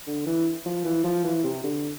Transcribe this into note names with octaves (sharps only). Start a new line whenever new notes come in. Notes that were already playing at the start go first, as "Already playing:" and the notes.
D3
E3
F3
E3
F3
E3
C3
D3